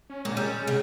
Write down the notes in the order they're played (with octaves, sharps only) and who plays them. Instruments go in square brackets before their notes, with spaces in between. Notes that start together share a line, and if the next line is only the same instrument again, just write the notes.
[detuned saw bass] C#4
[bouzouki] A#2 [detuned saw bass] G#3
[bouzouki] G3 C#4
C#3